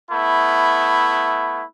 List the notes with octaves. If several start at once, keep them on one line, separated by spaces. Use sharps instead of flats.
A3 B3 E4